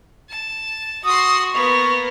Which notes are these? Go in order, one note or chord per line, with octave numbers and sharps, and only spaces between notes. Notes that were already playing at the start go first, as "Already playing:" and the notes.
A5
F#4 C6 D#6
A#3 B3 C#6